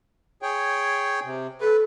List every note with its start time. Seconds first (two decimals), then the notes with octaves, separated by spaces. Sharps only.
0.42 G#4 C#5 G5
1.24 C3
1.61 A4 B4